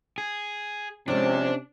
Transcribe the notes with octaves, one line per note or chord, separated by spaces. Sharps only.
G#4
C3 F3 G#3 C#4 D4 D5